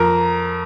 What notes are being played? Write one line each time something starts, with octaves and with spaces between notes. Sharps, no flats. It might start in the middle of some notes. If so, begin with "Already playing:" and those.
Already playing: F2 A#4 A#5